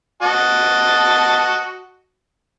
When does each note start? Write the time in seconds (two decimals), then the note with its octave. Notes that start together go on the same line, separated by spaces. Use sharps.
0.23 F#4 D#5 A5